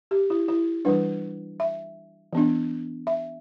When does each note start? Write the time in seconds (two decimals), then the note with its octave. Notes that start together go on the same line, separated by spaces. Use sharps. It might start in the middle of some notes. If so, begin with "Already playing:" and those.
0.11 G4
0.30 E4
0.48 E4
0.85 E3 G3 D4 B4
1.60 E5
2.33 E3 B3 D4
3.07 E5